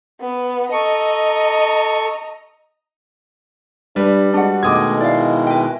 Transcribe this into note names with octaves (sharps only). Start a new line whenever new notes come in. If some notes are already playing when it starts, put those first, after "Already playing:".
B3
A4 D#5 A#5 C#6
G3 D4 B4
G#3 D4 F#4 F#5
B2 D#3 G#3 A3 D6 D#6 G#6
E4 D5 F5
B4 G5